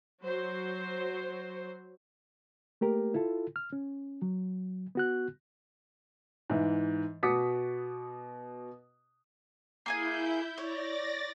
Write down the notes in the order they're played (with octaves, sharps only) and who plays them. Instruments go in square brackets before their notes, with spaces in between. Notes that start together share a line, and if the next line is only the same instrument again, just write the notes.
[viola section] F#3 C5
[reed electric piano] A3 A#3 G4 A#4
E4 F4 A4
F6
C#4
F#3
B3 F#4 F#6
[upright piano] G#2 E3
B2 F#4 D6 D#6 B6 C#7
[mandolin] A#3 G#4 G#5 [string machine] E4 G6
[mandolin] C#5 [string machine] D5 A6 A#6